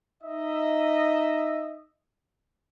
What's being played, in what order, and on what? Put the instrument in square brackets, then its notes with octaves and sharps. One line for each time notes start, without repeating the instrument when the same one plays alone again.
[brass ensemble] D#4 D#5 E5